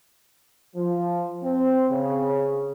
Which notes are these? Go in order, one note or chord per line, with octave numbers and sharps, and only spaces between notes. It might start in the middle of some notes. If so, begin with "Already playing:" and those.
F3
C4
C#3